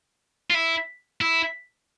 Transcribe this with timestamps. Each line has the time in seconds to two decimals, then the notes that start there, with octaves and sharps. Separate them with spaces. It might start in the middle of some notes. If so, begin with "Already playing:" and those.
0.50 F4
0.54 E4
1.21 E4